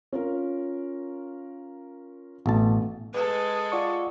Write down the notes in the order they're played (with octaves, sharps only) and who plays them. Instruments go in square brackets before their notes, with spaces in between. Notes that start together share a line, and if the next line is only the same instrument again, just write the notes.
[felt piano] C#4 F4 A#4
[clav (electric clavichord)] A1 A5 [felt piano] B2 A3 B3
[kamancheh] G#3 A4 [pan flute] B4
[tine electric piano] F4 D5 C#6 [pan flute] F#5